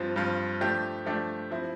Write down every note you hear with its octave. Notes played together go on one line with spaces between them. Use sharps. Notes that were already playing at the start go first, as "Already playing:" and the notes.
Already playing: G2 F3 C4 F4
G2 F3 C4 F4
F3 A3 D4 G4
F3 A3 D4 G4
F3 C4 E4